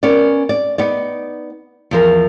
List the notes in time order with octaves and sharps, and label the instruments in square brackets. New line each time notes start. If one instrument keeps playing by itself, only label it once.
[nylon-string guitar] B3 C#4 A#4 D5
D5
B3 D#4 D5
E2 F3 A#4